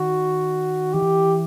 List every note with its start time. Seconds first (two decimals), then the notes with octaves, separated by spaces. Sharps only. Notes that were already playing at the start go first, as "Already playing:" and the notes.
Already playing: D#3 F#4
0.94 E3 G4